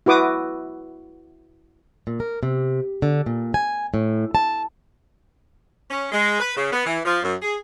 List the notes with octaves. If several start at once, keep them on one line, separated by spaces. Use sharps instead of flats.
E4 F#4 B4 D6 D#6
A#2
A#4
C3
D3
A#2
G#5
A2
A5
C#4
G#3
B4
C#3
B3
E3
F3
F#2
G#4